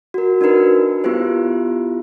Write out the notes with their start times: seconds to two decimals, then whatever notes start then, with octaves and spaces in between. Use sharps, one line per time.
0.14 F#4 A#4
0.41 D4 D#4 F#4 A#4 B4
1.04 B3 E4 F4 G4 C5